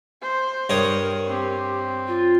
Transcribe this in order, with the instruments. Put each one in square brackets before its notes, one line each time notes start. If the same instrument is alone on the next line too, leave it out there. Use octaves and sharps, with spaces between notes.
[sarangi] C5
[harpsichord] G2 C#5 D#6 [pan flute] A#4
[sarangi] C4 [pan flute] G4
[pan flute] F4